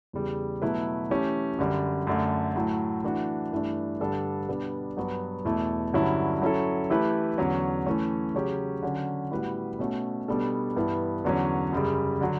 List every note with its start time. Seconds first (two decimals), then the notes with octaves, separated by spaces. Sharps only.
0.13 E2 C#3 G3
0.62 B2 F#3 A3 E4 B4
1.10 E3 A3 C#4 G4
1.58 F#2 D3 G3
2.07 F#2 D3 A3
2.56 A2 F#3 A3
3.04 E3 A3 D4 F#4
3.53 G2 E3 A3 D4
4.01 G2 D3 G3 D4 A4
4.49 B2 G3 B3 D4
4.97 G2 F#3 B3 F#4 B4
5.45 E2 B2 A3 E4 A4
5.93 G2 D3 F#3 C#4 E4
6.42 F#3 C#4 E4 A4
6.90 E3 A3 E4 G4 B4
7.38 E2 D3 F#3 C#4
7.86 E3 A3 C#4
8.34 C#3 F#3 C#4 G4
8.83 D3 F#3 C#4
9.31 A2 G3 B3 F#4 B4
9.79 B2 A3 C#4 F#4
10.28 B2 G3 B3 D4 A4
10.76 G2 E3 B3 E4
11.25 E2 D3 F#3 C#4
11.73 F#2 C#3 G3
12.21 D3 F#3